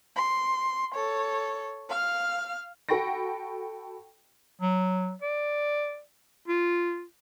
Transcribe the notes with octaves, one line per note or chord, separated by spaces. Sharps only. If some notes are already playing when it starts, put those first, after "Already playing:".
C6
A4 C#5
F5 F6
F#4 A4 G5 B5 C#6 A#6
F#3
D5
F4